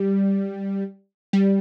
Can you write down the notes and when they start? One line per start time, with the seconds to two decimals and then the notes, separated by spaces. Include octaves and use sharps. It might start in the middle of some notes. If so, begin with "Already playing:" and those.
Already playing: G3
1.33 G3